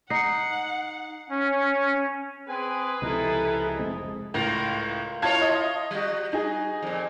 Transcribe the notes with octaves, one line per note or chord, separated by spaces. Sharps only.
D#4 F#5 C7 C#7
C#4
C4 G#4 B4 G#5
C#2 C3 F3 E4 A4 A#4 D#5
F1 G#3 C4 D#5
C#2 A2 F4 A#4
E4 F4 C#5 F5 A5 G#6
D#5
G3 F#4
D#4 G#4
F2 A#2